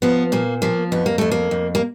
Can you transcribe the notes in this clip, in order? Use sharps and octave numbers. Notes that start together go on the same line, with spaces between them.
F3 B3
A#2 A#3
F3 A#3
F2 B3
A#3
F2 A3
A#3
F2
A#3